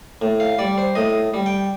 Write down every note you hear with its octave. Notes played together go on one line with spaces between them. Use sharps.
A2
F5
G3 D5
C5
A2 D#5
G3
G5